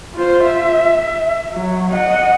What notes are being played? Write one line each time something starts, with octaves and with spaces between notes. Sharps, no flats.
F4 C5
E5
F#3
D#5 F#5